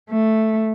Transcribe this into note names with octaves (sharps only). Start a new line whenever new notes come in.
A3